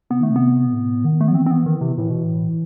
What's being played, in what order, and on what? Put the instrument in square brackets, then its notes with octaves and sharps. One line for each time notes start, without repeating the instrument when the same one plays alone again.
[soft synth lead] C3 [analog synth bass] B3
[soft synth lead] D#3 [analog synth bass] A3
[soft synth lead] C3
[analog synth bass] B3
[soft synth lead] B2
A2
D#3
[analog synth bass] A3
[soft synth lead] F#3 [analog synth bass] B3
[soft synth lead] E3 [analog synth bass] C4
[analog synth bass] C4
B3
D#3
C3
[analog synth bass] A2 [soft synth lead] E3
[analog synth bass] B2
A2